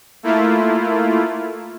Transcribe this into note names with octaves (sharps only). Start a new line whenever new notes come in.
A3 A#3 E4 F4